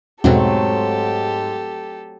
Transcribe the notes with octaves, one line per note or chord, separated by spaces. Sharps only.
E2 G#2 B2 F#3 A3 C4 G4 A4